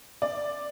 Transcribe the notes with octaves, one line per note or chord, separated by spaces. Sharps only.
D5